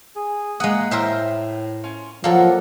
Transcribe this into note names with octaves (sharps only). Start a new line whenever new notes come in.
G#4
G#3 A#3 F#5 D#6
A2 A#4 C5 E5 G5 E6
C#4 F4
F3 F#3 A#3 A4 D5 F#5